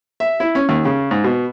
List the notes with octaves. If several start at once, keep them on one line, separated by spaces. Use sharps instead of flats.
E5
E4
C#4
D#2
C#3
G#2
B2